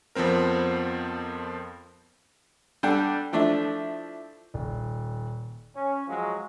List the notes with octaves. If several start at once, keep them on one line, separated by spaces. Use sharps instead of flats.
F2 F3 B3 C4 A#4
G3 D4 A4 F#5 G5
F3 A3 D4 E4
D#1
C#4
F3 F#3 G#3